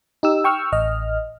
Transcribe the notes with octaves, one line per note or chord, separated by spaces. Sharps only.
D#4 G4 E6
G5 C#6 E6 F6
A1 D#5 F6